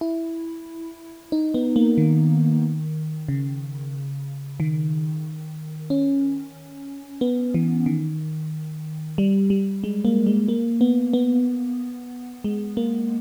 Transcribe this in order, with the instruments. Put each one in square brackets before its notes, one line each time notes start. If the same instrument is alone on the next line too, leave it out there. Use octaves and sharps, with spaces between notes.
[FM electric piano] E4
D#4
B3
A#3
D#3
C#3
D#3
C#4
B3
E3
D#3
G3
G3
G#3
A#3
G#3
A#3
B3
B3
G#3
A#3